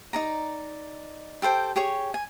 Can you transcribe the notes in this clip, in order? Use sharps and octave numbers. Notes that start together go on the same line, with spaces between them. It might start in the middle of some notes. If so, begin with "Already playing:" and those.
D#4 D5 A#5
G4 A4 C5 G5
G4 G#4 C#5 C#6
G#5